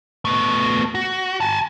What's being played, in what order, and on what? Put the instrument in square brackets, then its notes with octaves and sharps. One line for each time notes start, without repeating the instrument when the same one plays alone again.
[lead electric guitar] A3 B3
F#4
G#5 A5